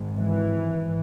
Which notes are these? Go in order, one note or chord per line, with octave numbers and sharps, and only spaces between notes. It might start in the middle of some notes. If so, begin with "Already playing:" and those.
Already playing: G#1 G#2
E3